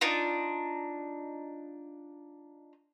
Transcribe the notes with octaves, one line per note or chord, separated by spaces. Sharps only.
D4 D#4 F4